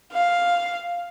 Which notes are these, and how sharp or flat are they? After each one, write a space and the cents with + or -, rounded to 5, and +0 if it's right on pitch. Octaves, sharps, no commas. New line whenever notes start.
F5 +0